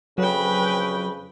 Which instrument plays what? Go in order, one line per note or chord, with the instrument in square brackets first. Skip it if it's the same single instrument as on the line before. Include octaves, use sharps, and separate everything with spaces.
[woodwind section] F2 C#3 [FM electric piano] F#3 [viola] B4 G5